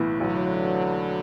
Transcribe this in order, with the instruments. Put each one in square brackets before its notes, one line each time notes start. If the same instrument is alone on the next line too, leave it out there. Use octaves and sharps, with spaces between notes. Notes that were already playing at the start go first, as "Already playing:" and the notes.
Already playing: [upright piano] B1 A2 E3 B3
[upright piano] B1 [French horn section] D3 F#3